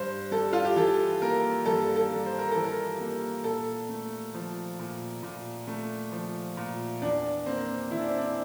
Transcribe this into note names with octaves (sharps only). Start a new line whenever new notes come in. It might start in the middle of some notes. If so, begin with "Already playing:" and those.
Already playing: G2 C5
G3 A4
F4
G4
E3 A4
A#3 A#4
G2 A4
A4
G3
C5
A#4
E3 A4
A#4
A#3
A#2 A4
A3
F3
A#2
A#2
A3
F3
A#2
E2 D4
A#3 C4
E3 E4
D4
C4
D4